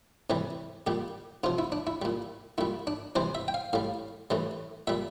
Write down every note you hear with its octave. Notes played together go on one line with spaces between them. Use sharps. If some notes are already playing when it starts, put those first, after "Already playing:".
C3 E3 G3
A#2 G3 G4
C3 F3 F4
E4
D4
E4
A#2 G3
A#2 G3 E4
D4
C3 E3 G3 C5
E5
G5
F5
A2 G3 F5
A2 E3 G3
A#2 G3 E5